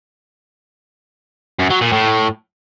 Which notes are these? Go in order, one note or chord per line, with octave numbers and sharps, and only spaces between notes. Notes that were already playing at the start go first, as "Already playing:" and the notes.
F#2
F#3
A#2
A2